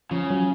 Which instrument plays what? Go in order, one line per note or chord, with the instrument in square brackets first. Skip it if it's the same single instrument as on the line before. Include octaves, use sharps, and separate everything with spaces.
[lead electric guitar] C#3 [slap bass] F3
[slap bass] F#3